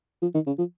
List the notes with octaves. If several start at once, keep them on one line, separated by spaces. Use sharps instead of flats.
F3
D#3
C#3
F3